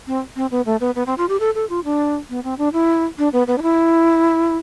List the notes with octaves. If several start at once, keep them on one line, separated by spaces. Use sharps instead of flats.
C4
C4
B3
A3
B3
B3
C4
F4
G4
A4
A4
F4
D4
B3
C4
D4
E4
D4
B3
B3
D4
E4